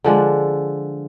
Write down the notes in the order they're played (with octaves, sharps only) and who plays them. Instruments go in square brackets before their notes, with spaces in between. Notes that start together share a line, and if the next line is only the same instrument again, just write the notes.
[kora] D3 F3 G#3 D4